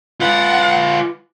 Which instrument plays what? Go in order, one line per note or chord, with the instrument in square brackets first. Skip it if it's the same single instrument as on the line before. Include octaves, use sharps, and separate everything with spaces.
[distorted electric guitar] F4 B4 [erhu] F#5